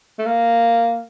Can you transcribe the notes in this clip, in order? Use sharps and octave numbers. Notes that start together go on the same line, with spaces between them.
A3
A#3